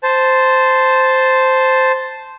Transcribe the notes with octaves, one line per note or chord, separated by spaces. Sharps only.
C5 A5